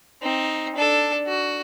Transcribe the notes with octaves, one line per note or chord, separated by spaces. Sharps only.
C4 D#4
D4 A4
F#4